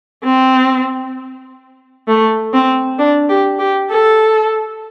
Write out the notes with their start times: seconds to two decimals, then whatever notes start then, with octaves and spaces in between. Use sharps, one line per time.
0.24 C4
2.08 A3
2.53 C4
2.99 D4
3.29 G4
3.59 G4
3.90 A4